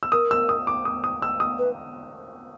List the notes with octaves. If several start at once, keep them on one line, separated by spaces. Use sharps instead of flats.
E6
A#4 D#6
E6
D#6
D6
D#6
D#6
E6
D#6
B4